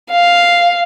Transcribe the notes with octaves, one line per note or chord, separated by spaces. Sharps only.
F5